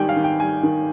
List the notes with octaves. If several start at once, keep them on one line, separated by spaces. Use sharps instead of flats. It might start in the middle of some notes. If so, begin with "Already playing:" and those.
Already playing: G#1 D#3 G3 G5 G#5
F5
D#3
G5
G3 G#5
D#3